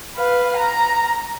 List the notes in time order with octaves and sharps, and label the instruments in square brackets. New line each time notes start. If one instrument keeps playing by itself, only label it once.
[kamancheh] B4 F5
A#5